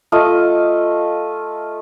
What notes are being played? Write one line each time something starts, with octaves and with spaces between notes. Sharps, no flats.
A3 F4 D#5